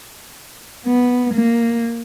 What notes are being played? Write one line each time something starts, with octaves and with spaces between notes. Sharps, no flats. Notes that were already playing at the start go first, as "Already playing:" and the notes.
B3
A#3